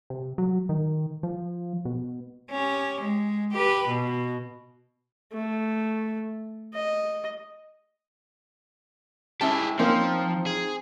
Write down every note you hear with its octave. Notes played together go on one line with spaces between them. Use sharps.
C3
F#3
D#3
F3
B2
C#4 G4
G#3
G4 B4
B2
A3
D#5
G#3 C#4 E4 G4 G#4 A5
F3 A#3 C4 C#4 D#4 F4
G#4